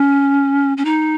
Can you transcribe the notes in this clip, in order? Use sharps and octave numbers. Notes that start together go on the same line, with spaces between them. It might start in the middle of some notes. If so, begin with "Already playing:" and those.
Already playing: C#4
C#4
D#4